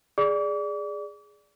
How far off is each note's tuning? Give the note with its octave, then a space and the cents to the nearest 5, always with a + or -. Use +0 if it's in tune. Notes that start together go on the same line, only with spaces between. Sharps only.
G#4 +0 D5 +0 D6 -40